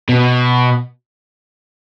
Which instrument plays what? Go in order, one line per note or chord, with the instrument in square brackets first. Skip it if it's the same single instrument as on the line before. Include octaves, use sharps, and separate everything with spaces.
[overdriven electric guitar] B2